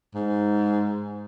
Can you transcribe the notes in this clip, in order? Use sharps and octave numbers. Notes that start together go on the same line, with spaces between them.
G#2